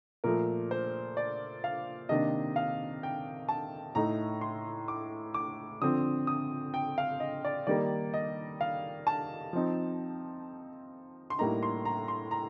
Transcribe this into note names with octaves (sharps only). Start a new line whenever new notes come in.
A#2 F3 A3 A#4
C5
D5
F5
C3 D#3 A#3 D4 D#5
F5
G5
A5
A2 A3 D#4 A#5
C6
D6
D6
D3 F3 C4 D#6
D#6
G5
F5
D#5
D5
D#3 G3 A#3 D#4 D5
D#5
F5
A5
F3 C4 D#4
C6
A2 G3 A#3 D#4 A#5
C6
A#5
C6
A#5